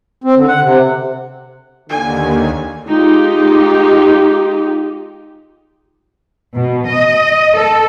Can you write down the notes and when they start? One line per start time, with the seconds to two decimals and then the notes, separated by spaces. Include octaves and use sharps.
0.24 C4
0.36 D3
0.48 F#5
0.61 C3
1.90 D#2 D3 G#5
2.86 G#3 D#4 F4 G4
6.55 B2
6.86 D#5
7.56 A4